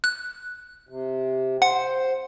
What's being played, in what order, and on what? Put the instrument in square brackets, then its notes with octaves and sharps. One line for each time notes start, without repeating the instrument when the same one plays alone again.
[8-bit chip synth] F#6
[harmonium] C3
[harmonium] C5 [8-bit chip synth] F#5